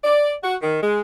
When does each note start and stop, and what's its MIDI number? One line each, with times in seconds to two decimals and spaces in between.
0.04 0.34 74
0.43 0.56 66
0.62 0.82 51
0.83 1.01 56